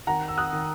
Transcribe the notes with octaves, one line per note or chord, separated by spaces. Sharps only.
D#3 F#5 A#5
E6
D#6 F#6
D#3